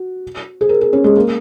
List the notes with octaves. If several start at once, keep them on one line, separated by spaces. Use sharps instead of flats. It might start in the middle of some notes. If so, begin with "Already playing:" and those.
Already playing: F#4
G#4
A#4
G#4
C#4
G#3
A#3